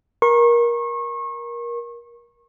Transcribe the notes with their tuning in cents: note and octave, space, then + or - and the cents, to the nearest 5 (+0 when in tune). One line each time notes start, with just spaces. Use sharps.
A#4 +20 C#6 -35